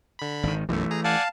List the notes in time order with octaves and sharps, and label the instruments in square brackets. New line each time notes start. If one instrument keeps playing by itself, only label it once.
[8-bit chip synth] D3 B5
[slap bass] G#1 D#3
[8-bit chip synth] B1 F#2 [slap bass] E3 G#3 A3
[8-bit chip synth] G#4 A#5
[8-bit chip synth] D5 F#5 G#5 [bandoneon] F5 A5